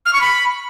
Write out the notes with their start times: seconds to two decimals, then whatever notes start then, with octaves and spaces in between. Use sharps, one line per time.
0.06 F6
0.13 C#6
0.21 B5